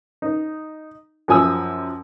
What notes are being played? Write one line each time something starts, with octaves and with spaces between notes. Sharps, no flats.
D#4
F#2 F3 G#5 D#6 E6